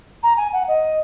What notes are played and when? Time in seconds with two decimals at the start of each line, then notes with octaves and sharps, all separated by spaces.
0.23 A#5
0.37 G#5
0.53 F#5
0.68 D#5